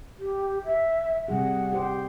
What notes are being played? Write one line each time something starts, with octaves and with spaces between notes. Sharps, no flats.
G4
E5
C3 G3 G#4 F#5
G4 C5